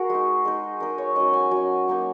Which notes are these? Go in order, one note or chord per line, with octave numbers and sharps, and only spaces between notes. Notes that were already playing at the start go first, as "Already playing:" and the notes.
Already playing: F#4 G#4 A#4
G#3 D#4
G#3 D#4
G#3 D#4 A#4
C#5
F#3 C#4 D#5
G#5
F#3 C#4 G#5
F#3 A#3 D#4